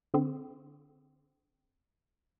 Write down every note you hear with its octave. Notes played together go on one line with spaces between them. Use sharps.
D3 C4